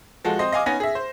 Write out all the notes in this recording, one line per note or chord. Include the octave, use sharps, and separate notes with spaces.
F3 G#3 F#4 A4
C4 D#5 C6
D#5 F5 G#5 D6
B3 C#4 D#4 G#5 A#6
G#4 E5
C5